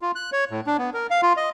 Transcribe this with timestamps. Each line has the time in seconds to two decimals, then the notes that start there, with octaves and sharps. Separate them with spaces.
0.02 F4
0.15 F#6
0.32 C#5
0.51 A2
0.67 D4
0.78 B3
0.94 A#4
1.10 F5
1.23 F4
1.37 D#5